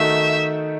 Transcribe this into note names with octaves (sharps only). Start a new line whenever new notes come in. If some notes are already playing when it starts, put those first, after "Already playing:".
Already playing: D#3 A3 D#4 F#4 E5